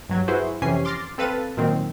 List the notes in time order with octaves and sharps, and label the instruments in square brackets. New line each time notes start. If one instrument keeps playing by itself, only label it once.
[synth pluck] G2 F#3 G#6
E4 F#4 G#4 B4 C5
F2 C3 E3 C#4 G#5 C7
C6 D6 F6 A6 A#6 C7
C4 A4 B4 F5 A6 D#7
A#2 D#3 F#3 C4